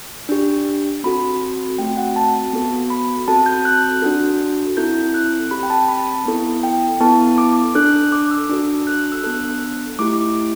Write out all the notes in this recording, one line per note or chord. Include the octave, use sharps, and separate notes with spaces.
D4 G4
C4 F#4 A4 B5
A3 C4 F#4 G5
F#5
A5
B3 F#4 A4
B5
C4 F#4 A4 A5
G6
F#6
D4 F#4 A4
C4 E4 A4 G6
F#6
C4 G4 B5
G5
A5
B5
B3 E4 A4
G5
B3 E4 A4 A5
D6
D4 A4 F#6
D6
E6
D4 F#4 A4
F#6
F#6
E6
B3 D4 A4 F#6
A3 E4 G4 D6